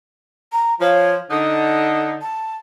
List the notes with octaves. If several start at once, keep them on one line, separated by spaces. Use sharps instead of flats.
A#5
F3 C#5
D3 D#4 D#6
A5